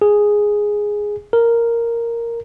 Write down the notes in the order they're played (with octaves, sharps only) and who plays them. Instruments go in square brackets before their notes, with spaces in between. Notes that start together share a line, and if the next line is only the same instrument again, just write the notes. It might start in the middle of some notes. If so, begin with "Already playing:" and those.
[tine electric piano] G#4
A#4